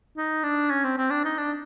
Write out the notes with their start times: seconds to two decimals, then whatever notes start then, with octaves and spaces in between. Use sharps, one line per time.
0.17 D#4
0.43 D4
0.70 C#4
0.84 C4
0.97 C4
1.10 D4
1.24 D#4
1.38 D4